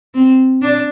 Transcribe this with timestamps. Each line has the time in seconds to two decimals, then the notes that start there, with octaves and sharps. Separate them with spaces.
0.14 C4
0.62 D4